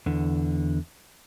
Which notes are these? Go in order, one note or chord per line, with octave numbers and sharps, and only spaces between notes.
E2 D3